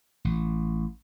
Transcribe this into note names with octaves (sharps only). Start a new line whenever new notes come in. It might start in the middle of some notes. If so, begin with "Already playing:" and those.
A1